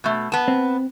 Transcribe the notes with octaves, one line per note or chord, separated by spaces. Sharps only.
B2 A3
B3 A5
C4